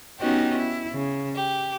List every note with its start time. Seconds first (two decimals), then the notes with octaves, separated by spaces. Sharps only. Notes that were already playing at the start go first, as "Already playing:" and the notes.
0.19 B3 C#4 D#4 F#4 G4 D#5
0.56 E4
0.93 C#3
1.35 G4